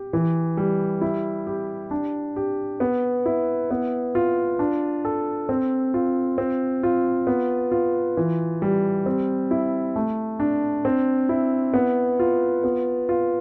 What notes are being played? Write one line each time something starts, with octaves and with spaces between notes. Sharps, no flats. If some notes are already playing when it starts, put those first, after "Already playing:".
Already playing: G4
E3
G3
E4
G4
D4
G4
B3
E4
B3
F4
D4
A4
C4
F4
C4
F4
B3
F4
E3
G3
C4
E4
A3
D4
C4
E4
B3
F4
B3
F4